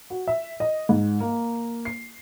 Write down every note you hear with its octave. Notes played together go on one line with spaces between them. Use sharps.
F#4
E5
D#5
G#2
A#3
C7